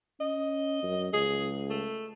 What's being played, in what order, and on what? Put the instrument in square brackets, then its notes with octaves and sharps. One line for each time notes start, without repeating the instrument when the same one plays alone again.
[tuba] C#4 [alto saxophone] D#5
[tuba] F#2
[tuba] C#2 [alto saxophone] G#4
[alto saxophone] A3